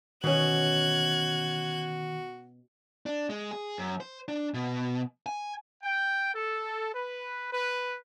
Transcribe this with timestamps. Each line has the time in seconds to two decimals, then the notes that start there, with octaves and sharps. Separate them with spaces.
0.24 B2 D#3 C#4 F#4 F#6 G#6
3.06 D4
3.30 G#3
3.51 G#4
3.78 F#2
4.00 C5
4.28 D4
4.54 B2
5.26 G#5
5.83 G5
6.34 A4
6.93 B4
7.51 B4